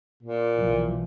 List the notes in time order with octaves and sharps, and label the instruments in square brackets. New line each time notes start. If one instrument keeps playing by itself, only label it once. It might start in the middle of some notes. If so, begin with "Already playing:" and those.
[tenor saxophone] A#2
[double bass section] B1 E3 F3